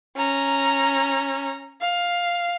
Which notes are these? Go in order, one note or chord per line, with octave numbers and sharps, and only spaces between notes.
C#4 A#5
F5